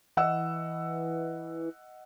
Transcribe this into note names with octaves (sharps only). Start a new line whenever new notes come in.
E3 D#5 F#5 E6